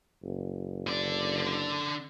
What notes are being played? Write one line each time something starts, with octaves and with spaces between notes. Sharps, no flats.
F#1
D3 D5